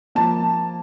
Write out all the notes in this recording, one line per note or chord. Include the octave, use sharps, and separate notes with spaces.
F3 A#3 A5